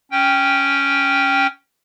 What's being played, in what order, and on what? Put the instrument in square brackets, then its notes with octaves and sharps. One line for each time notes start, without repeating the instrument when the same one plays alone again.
[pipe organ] C#4 G5